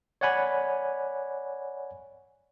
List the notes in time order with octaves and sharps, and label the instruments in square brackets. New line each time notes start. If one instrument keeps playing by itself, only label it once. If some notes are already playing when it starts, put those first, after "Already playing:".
[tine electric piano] C#5 D5 F#5 G#5 B5